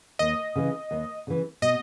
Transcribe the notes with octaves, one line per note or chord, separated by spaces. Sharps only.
D#2 D#5
C#3 E3
D#2
C#3 E3
B2 D#5